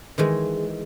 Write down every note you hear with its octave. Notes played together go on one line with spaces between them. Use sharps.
D#3 E3 G#3